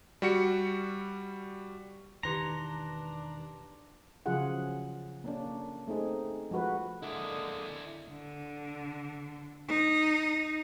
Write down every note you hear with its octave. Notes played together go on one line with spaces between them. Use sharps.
G3 F#4 C#7
E1 D#3 E3 D4 G4 B4 A#5 C6
C#3 F3 F#3 F4 G#4 F#5
A#3 C#4 D4
A3 C4 D#4 G#4
F3 G#3 F#4 B4
D3 G#3 A#3 E4 D5 D#5
D3
D#4